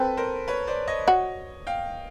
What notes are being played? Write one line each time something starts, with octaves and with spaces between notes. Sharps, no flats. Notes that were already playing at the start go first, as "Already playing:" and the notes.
Already playing: C4 A4 B4
A#4 C5
B4 C#5
C5 D5
C#5 D#5
F#4
F5 G5